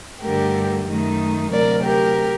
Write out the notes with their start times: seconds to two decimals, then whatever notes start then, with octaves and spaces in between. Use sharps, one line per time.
0.22 G2 D3 A3 G4 A#4
0.87 F#2 D#3 A3 D#4
1.52 D2 C3 F#3 A#4 D5
1.84 G4 A#4